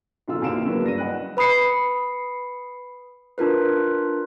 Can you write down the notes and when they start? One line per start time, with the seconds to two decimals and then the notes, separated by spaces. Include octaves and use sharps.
0.28 B1 D3 F4 E6
0.42 D#2 C3 E3 F5 D7 E7
0.65 C#3 E3 F#3 A#3 D4 B4
0.83 G2 A#6 D#7
0.98 D#5 F#5 B5 F#6
1.37 B4 B5 D#6 C7 C#7
3.38 D4 F4 A#4 B4